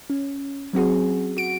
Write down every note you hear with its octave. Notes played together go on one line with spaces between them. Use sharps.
C#4
F#3 C4 F#4 G#4
F#4 D7